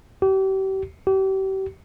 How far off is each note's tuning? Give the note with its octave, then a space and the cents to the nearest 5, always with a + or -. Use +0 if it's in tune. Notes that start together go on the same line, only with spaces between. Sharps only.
G4 -35
G4 -35